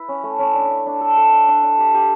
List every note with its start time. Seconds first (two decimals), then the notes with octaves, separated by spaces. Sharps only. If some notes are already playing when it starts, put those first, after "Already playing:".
Already playing: E4 B4
0.08 C#4
0.24 A3
0.39 C#4
0.55 D4
0.71 E5
0.86 D4
1.01 A4
1.17 A4
1.32 D4
1.48 D4
1.63 D4
1.79 G4
1.94 G4